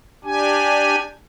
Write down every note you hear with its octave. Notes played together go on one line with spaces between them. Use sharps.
D4 G4 G#5